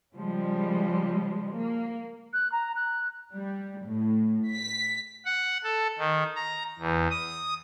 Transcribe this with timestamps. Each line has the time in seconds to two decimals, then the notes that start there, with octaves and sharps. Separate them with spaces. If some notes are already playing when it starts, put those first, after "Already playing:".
0.15 C#3 F3 G3 G#3
1.56 A#3
2.33 F#6
2.52 A#5
2.76 F#6
3.35 G3
3.86 A2
4.51 B6
5.25 F#5
5.64 A4
5.99 D#3
6.36 A#5
6.79 E2
7.10 D#6